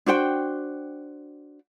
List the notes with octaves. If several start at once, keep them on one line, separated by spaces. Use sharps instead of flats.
D4 F#4 C5 G5